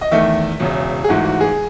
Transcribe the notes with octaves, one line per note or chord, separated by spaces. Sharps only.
D#5
E2 D#3 A3 E5
E1 E2 C#3
G#4
G#1 G#2 E3 A3 F#4
F#4
G#4